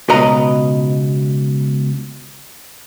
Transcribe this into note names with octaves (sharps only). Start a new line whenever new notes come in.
C#2 B2 B4 D#5 A#5